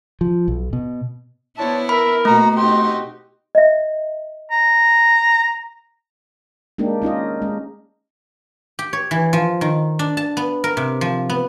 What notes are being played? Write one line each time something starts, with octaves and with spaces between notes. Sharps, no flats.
F3
B1
B2
B3 D4 E4 C5 C#5 A5
A#4 E5 B5
B2 A3 A#3 F#4 A#5
C4 D#4 E4 F#4 G4 C6
D#5 E5
A#5
G#3 A#3 D4 D#4 G4
C#4 D#4 F4 D#5
G#3 C#4
G4
C#5
E3
F3
D#3
D4
A5
B3
A#4
C3
F3
B3